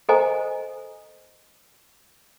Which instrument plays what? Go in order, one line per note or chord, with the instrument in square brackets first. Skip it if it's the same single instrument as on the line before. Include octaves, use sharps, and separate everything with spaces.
[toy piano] A4 A#4 C5 D#5 G#5 A#5